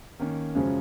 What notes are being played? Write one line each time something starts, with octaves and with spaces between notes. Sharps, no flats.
D#3 A#3 C#4
F#2 C#3 F3 G#3 C#4